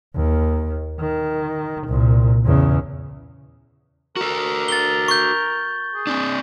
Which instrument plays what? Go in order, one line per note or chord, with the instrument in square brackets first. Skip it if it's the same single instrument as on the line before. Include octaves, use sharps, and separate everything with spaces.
[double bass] D#2
D#3
C2 A#2
E2 C#3
[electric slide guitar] F#4 A4 [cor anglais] A#4
[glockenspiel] A6 G7
C#6 G6
[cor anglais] G#4
[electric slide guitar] C4 D4